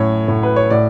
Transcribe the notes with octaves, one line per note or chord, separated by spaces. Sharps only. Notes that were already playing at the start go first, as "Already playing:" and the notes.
Already playing: F#2 A2 C#5
A2
B4
C#5
A2 D5